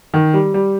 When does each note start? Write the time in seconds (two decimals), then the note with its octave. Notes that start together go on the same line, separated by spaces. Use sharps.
0.14 D#3
0.34 G3
0.54 G3